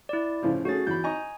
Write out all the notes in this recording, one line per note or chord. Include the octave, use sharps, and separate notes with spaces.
E4 D5
A2 C#3 F3
A3 C#4 F#4 G#4 A6
E2 B5 G6
D#5 G#5 A#5 C#6